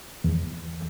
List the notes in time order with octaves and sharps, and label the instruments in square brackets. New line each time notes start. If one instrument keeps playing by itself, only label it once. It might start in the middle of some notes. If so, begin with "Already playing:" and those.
[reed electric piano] E2